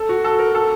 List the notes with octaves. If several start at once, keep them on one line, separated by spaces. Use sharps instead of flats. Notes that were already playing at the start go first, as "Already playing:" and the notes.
Already playing: A4
F#4
A4
A#4
A4